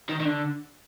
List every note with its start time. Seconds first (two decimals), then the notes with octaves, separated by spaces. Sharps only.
0.09 D#3
0.20 D#3
0.25 D3